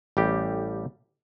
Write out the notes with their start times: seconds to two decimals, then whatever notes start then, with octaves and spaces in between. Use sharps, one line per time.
0.17 A1 G3 G4